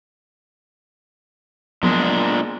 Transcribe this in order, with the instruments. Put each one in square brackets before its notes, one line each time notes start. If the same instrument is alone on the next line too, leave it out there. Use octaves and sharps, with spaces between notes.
[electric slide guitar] A#2 G#3 D4 [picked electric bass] F3 F#3 B3